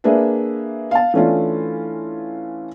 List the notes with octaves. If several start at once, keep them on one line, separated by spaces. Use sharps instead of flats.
A#3 D4 G#4 B4 E5
F5 A5
E3 A3 C#4 D4 F4